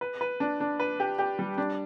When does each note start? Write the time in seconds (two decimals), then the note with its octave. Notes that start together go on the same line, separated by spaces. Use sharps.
0.01 B4
0.21 B4
0.40 D4
0.60 D4
0.80 B4
1.00 G4
1.19 G4
1.39 G3
1.58 D4